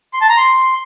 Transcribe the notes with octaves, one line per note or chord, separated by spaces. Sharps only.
C6
A5
A#5
C6